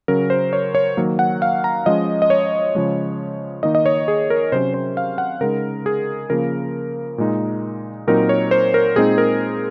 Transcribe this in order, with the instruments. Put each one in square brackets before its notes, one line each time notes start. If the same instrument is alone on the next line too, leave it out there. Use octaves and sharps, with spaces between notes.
[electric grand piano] C#3 F#3 C#4 A#4
C5
C#5
C#5
D#3 F#3 A#3
F#5
F5
A#5
F3 G#3 C#4 D#5
D#5
C#5
C#3 F3 G#3
D#3 A#3 D#4 D#5
D#5
C#5
G#4
A#4
C3 F#3 C#4 C5
C5
F5
F#5
C#3 G#3 D#4 A#4
G#4
C#3 F3 A#3 A#4
A#2 G#3 D#4
A#2 F#3 C4 D#4 A#4
C#5
C5
A#4
A#2 G#3 C4 D#4 G#4
A#4